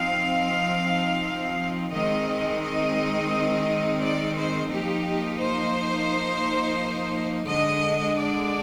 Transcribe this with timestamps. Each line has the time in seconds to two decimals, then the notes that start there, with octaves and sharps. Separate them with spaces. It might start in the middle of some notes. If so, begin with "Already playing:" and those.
Already playing: F3 C4 D#4 F5
1.93 D#3 G#3 C4 D#4 D#5
2.63 D#5
4.01 D5
4.36 C5
4.70 F3 A#3 D#4 G4
5.39 C5
7.47 D3 G#3 D4 D#5
8.17 D5